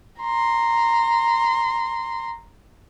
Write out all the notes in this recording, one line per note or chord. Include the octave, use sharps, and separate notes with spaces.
A#5 C6